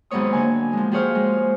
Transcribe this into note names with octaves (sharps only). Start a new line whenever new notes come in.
D#2 G#2 F#3 B3 C#5 D#6
D3 A#3 G#5
F3 G#3
F3 G4 G#4 C5 C#5 F5
G#3